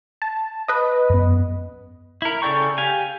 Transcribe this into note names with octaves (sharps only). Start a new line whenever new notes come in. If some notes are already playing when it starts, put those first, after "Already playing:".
A5
B4 D#5
F#2 B3
E4 A#4
C#3 A4 D5 G5 C#6
G4 F5 G#5